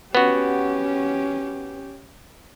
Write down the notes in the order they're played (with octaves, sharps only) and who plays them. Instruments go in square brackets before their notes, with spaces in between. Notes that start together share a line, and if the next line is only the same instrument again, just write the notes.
[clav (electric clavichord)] B3 F#4 [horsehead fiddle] C#4 G4